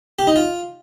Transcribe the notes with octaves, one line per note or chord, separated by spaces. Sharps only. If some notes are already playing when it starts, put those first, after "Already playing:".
G4
D#4
F4